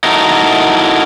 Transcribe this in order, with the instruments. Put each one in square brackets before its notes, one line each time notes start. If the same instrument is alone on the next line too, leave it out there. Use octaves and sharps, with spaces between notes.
[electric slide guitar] D#4 E4 F#4 A4 A#4